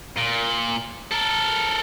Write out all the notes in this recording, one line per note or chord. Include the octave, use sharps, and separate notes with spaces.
A#2
A4 A#4